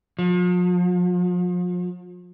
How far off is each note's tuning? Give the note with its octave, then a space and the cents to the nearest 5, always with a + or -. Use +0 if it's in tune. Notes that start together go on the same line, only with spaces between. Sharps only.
F3 +40